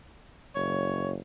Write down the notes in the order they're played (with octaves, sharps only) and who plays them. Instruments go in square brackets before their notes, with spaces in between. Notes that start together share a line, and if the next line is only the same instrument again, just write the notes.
[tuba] F#1 [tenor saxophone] C#5